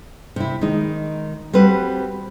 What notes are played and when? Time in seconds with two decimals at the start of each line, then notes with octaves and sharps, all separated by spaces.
0.36 C3 E4
0.61 D#3 G#3 D#4
1.53 G3 C4 F#4 B4